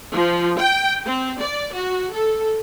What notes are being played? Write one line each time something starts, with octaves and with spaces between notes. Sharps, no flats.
F3
G5
C4
D5
F#4
A4